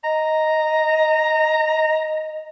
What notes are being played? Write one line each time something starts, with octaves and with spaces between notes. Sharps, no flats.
D#5 A#5